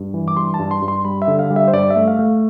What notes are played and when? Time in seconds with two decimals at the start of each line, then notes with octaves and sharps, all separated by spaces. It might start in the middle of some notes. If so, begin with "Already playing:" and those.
Already playing: G2
0.14 E3
0.28 D6
0.37 G2 C6
0.54 A5
0.59 G2
0.71 C6
0.82 G2
0.88 C6
1.05 G3 B5
1.22 E5
1.28 D3
1.39 F5
1.50 G3
1.56 E5
1.68 C5
1.73 G2 D5
1.90 E5
1.96 A3
2.08 F5
2.19 A3